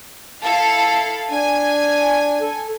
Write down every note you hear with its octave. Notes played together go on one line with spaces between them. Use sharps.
E4 A4 F5
D4 G#5
A4